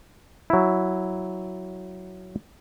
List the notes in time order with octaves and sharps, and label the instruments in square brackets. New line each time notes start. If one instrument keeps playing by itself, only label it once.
[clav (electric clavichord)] F#3 E4